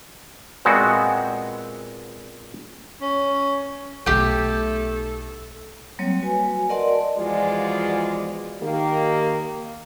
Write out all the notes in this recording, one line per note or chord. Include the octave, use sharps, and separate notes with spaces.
A#2 G#3 B3 C4 F#4
C#4
B1 A3 D#4 G4 A4 G5
F#3 G3 A#3 C4 C#5
F#4 B4 G#5
A#4 D5 D#5 F#5 A5 C6
E2 F3 G#3 F4 F#4 D5
D#3 A#3 G4